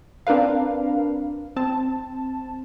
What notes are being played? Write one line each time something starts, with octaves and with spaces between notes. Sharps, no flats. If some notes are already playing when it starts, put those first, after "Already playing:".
C4 D4 A#4 B4 F5
C4 A5